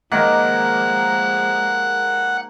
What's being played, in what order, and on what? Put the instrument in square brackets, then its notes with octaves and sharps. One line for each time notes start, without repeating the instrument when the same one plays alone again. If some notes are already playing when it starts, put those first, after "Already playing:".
[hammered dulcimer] D#3 A#3 [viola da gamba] F3 G#3 [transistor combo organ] F#5